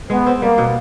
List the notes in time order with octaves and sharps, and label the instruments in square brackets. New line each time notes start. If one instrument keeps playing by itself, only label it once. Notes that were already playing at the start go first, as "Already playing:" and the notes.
[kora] G#3 [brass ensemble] B3
[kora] C4
[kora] G3 [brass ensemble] A#3
[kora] B2